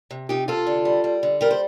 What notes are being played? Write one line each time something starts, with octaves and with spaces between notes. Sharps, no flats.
C3
C3 D#4 G4
C3 F4 A4
D3
G3
G3
D3
G3 G4 A#4
C5